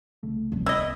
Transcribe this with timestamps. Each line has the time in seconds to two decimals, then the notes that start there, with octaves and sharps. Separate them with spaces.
0.23 C2 C#3 A3
0.52 D1 C3 F3 G3
0.66 C2 B3 C#4 E4 D#5